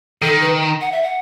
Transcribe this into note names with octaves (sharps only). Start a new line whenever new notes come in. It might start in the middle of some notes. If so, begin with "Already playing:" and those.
D#3 A4
B4
F#5
E5
F#5